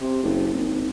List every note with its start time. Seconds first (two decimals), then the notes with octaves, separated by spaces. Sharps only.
0.01 C3
0.23 F#1
0.53 G#1